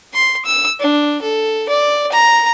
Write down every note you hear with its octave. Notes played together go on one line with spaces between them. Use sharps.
C6
E6
D4
A4
D5
A#5